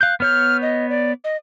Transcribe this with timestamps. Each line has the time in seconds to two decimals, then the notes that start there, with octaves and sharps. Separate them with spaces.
0.01 F5 F#6 G6
0.20 B3 C#5 F6 G6
0.62 D#5
0.90 D5
1.24 D#5